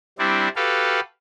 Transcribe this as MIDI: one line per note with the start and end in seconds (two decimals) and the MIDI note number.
0.18 0.48 55
0.18 0.48 60
0.18 0.48 62
0.18 0.48 64
0.56 1.00 66
0.56 1.00 67
0.56 1.00 69
0.56 1.00 71
0.56 1.00 77